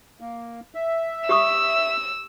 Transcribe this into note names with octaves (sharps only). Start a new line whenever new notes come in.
A#3
E5
G4 C#6 D#6 E6